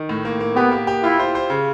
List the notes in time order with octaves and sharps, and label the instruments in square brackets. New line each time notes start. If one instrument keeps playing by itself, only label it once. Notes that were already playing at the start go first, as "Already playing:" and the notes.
Already playing: [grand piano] D#3
A2
A#3
A#3
[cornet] B3 [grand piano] G4
[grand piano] A#3
G4
[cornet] E4 [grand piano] F4
[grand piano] C5
C5
C#3